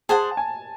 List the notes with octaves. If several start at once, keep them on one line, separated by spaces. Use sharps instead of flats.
G#4 C5 F#5 A5
G#5